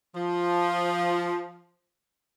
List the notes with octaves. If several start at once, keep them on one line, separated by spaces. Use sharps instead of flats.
F3